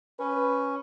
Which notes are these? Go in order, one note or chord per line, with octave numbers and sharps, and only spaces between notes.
C#4 B4